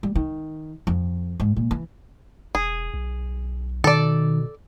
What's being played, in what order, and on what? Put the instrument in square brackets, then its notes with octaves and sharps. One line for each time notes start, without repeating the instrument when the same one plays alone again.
[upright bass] G3
D#3
F2
G#2
A#2
E3
[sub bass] E1 [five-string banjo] G#4
[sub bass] B1
[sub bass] B2 [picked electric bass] D#3 [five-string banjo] A4 D5